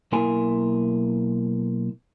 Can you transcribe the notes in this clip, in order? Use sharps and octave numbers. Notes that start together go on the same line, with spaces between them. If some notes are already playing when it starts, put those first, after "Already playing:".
B1 A#3 E4 A#4 G#5 C6